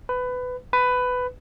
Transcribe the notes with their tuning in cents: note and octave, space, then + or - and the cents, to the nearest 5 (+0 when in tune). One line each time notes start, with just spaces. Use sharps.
B4 +20
B4 +15